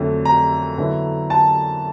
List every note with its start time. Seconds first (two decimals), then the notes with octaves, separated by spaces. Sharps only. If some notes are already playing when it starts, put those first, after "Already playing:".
Already playing: F2 D3 F#3 A3
0.25 A#5
0.78 D3 F#3 B3 E4
1.30 A5